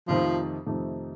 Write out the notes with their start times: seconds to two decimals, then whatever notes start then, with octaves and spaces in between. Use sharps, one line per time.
0.08 F2 C3 D#3 F3 A3 D#4
0.66 F2 C3 D#3 A3 D#4